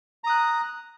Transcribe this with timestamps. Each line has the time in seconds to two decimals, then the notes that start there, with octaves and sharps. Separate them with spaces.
0.24 A#5
0.27 D#6
0.30 F#6